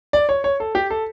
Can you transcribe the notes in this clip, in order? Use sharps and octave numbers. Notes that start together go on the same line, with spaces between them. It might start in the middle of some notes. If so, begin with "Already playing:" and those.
D5
C#5
C#5
A4
G4
A4